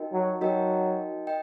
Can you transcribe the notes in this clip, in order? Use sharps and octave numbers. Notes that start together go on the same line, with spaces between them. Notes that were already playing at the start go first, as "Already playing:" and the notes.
Already playing: D#4 F#4 A#4 D#5 G5
F#3
F#3 D#4 F#4 A#4 D#5 G5
D#5 G5